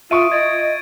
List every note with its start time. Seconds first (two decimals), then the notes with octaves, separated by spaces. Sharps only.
0.11 F4 E5 C#6 D#6 D7 D#7
0.32 D#5 G#6 A6 D7